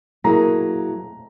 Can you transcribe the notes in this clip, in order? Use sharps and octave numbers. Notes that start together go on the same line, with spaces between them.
F#3 A#3 E4 G#4 A#5